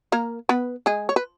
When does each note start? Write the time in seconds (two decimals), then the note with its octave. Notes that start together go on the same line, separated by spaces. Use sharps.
0.12 A#3 A#4
0.49 B3 B4
0.86 G#3 G#4
1.09 C#5
1.16 B4